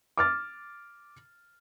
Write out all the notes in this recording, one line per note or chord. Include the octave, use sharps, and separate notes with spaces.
D6 F6 A6